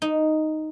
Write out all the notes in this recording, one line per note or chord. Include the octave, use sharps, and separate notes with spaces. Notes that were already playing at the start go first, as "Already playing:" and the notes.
D#4